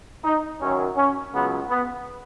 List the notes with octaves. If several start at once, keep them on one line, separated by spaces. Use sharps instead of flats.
D#4
F#2 D#3 F#3 C#4
C#4
C#2 C#3 F#3 B3
B3